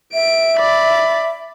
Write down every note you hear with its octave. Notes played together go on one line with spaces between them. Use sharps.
E5 D7
D5 B5